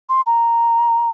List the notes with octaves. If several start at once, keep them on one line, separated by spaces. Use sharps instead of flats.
C6
A#5